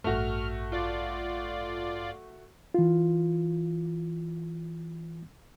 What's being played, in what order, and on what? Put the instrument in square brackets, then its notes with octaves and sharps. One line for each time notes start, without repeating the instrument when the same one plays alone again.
[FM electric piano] A1 G2 [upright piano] A3 F#4 [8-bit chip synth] F6
[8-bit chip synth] F4 D5
[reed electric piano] E3 F4